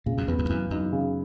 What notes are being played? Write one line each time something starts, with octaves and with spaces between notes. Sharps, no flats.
A#2 C#3
F#2
E2 B3
F#2
E2
F#2 E3
F#2 D#4
C#3